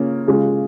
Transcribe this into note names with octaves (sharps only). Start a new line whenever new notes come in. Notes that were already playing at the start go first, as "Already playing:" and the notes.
Already playing: C#3 A#3 C#4 F4
C#3 G#3 F4